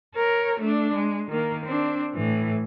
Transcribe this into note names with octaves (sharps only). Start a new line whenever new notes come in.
A#4 C#5
A3 D4
G#3
D#3 A#3
C4 D4
A2 E3